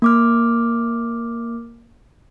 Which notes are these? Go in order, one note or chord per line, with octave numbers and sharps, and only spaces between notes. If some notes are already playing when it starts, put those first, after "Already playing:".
A#3 D6 F6